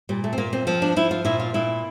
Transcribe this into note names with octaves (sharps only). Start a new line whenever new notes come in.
A#2 G3
A3
C4
A#2 A#3
C4
F3 C4
D4
F3 E4
F4
A#2 E4
F4
A#2 E4